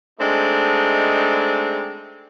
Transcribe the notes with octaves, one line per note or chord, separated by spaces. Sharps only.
G#3 A3 C4 D4 D#4